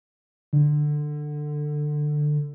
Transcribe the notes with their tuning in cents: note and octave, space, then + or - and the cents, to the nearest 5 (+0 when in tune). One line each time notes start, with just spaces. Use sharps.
D3 +15